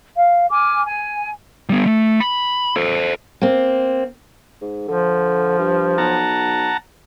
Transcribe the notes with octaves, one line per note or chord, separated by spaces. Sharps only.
F5
G#5 D6 F6
G#5
G3 B3
A3
B5
A4 C5
A#3 C4
G#2
D3 F3
G2
B1 F#5 A5 A#5